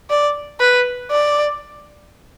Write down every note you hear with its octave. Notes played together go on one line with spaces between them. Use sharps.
D5
B4
D5